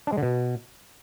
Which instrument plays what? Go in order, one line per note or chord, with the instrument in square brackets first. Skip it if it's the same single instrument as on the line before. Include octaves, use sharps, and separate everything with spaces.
[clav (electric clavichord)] D4
G#3
D3
B2